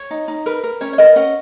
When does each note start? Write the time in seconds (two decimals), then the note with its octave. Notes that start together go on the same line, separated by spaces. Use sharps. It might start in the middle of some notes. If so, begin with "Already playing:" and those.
Already playing: C#5
0.11 D#4
0.28 D#4
0.46 A#4 B4
0.64 A#4
0.81 C#4 C#5
0.93 C#5
0.98 A#4 B4 D#5
1.16 C#4 D#5 F#5